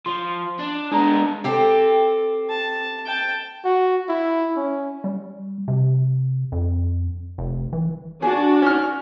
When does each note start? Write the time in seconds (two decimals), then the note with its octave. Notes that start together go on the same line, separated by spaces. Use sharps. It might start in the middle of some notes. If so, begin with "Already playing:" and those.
0.06 F3 C6
0.59 D4
0.92 G#3 B3 D4 A#5
1.44 C4 G4 A4
2.49 A5
3.05 G5 A5
3.65 F#4
4.09 E4
4.56 C#4
5.04 G3
5.68 C3
6.52 F2
7.38 F1
7.73 E3
8.22 D4 F#4 G#4
8.62 C#4 F6